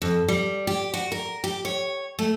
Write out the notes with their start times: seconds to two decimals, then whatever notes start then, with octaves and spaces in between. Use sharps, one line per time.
0.02 F2
0.28 G3
0.67 G4
0.94 F#4
1.12 A#4
1.44 G4
1.65 C#5
2.19 A3